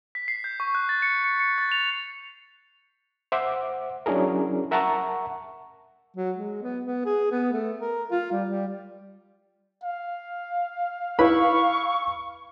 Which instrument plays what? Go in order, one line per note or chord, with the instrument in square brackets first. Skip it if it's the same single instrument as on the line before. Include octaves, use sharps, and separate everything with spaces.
[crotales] B6
C7
G6
C#6
F#6
A6
C#7
C#7
C#7
A6
F7
[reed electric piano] C5 E5 F#5 D6
F#3 C#4 D4 E4 G#4 A#4
A#4 E5 F#5 A5 A#5 C#6
[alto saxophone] F#3
G#3
B3
B3
G#4
B3
A3
A#4
F4
G3
G3
[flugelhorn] F5
[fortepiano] E4 B4 B5 [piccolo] C#6